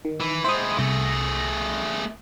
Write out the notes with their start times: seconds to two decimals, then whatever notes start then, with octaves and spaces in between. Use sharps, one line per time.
0.05 D#3
0.20 E3
0.44 G#3 E4 C5 D#6
0.79 C2 A3 G#4 A#6